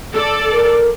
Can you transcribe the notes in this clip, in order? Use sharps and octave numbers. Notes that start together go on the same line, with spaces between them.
A4 D5
A#4